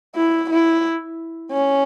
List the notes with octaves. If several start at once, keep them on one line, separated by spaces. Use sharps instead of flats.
E4
E4
C#4